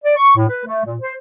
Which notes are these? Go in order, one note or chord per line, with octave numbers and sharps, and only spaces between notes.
D5
C#6
A2
B4
A3
A#2
C5